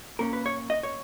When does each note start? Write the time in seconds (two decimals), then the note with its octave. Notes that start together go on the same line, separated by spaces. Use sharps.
0.19 A#2 A#3 C#4 A#4
0.33 B4
0.46 C#5
0.70 D#5
0.83 C#5